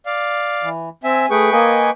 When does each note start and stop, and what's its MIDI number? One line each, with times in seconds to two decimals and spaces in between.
0.06 0.69 74
0.06 0.69 77
0.63 0.89 52
1.04 1.26 60
1.04 1.26 76
1.04 1.29 80
1.30 1.50 57
1.30 1.50 68
1.30 1.91 71
1.30 1.91 79
1.30 1.91 85
1.52 1.90 58
1.52 1.90 75
1.52 1.90 80